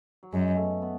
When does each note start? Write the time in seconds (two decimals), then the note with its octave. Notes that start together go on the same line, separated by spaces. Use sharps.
0.23 F#3
0.33 F#2 G#3
0.56 A3
0.62 B3
0.82 B3